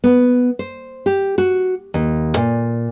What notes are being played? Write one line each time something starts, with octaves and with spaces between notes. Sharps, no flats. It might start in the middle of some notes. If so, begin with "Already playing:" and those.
B3
C5
G4
F#4
D#2
A#2